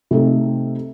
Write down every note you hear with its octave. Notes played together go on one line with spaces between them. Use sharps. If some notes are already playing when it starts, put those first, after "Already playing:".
C3 A3 D#4